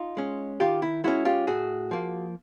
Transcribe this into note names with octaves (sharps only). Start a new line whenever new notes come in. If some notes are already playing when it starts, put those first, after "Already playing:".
Already playing: D#4 F4
G#3 C#4
D#3 F4 G4
E4
G#3 C#4 E4 F#4
F4 G4
A2 F#4 G#4
F3 A#3